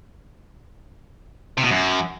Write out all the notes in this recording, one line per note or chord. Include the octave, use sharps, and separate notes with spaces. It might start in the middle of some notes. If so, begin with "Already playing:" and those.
C3
B2
F#2